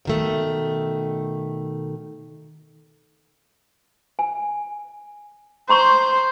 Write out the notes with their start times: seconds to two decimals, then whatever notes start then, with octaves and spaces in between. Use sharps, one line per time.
0.05 B2 D#3 A3
4.19 G#5
5.69 C5 A#5 C6 C#6